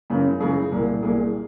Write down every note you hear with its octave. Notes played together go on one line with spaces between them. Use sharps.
F#2 C#3 E3
F#2 C#3 E3 G#4
C2 A#2
C2 A#2 G#4